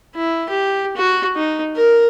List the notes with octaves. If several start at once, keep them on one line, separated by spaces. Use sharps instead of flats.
E4
G4
F#4
D#4
A#4